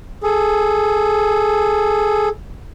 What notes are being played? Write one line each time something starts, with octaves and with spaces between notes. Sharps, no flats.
G#4 A4